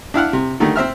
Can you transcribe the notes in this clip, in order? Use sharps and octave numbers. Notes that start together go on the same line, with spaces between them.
D4 E4 F5 F#5
C3
D3 D#3 G3 A3
C4 C5 E5 F6